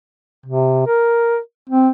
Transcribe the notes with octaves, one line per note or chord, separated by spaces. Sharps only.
C3
A#4
C4